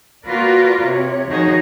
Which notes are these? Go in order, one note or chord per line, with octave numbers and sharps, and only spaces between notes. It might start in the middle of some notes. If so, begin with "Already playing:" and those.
A#3 F4 F#4 A#4 B4 D5
C3 C#5
D#3 F3 D#4 F#4 G#4 C#5